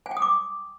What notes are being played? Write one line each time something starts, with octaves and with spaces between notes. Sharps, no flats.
G#5
G5
D#6
D6